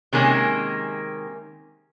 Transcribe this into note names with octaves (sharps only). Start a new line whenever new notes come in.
C3 D#3 G#3 A#3 C#4